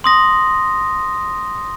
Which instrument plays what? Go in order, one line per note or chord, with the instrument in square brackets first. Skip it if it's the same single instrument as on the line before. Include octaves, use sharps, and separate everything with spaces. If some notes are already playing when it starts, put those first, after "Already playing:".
[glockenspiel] C6 D#6 A#6